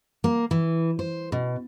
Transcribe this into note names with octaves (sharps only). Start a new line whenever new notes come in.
A#3
E3
C5
B2